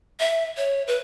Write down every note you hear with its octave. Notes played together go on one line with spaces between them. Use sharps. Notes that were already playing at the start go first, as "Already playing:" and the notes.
E5
C#5
B4